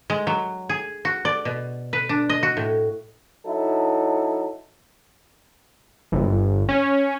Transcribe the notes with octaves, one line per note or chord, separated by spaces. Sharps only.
G#3
F#3
G#4
F#4
D5
B2
B4
D4
D#5
F#4
A2
F#3 D#4 E4 A4
G1
C#4